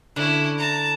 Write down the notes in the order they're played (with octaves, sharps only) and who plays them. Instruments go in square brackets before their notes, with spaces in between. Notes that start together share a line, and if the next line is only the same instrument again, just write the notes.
[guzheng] D3 [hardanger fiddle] C#4 E4
[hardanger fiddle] A5 A#5